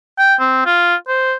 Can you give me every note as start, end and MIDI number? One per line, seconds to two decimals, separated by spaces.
0.18 0.35 79
0.40 0.63 60
0.66 0.95 65
1.08 1.34 72